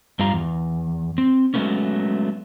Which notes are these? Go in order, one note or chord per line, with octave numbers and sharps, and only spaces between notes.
G2 G3 F4 A#5
E2
C4
F#3 G#3 A3 B3 C#4